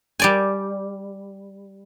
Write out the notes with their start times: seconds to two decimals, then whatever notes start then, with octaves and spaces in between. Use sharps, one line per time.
0.20 G3 D5 G#5